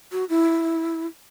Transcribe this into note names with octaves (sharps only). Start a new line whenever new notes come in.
F#4
E4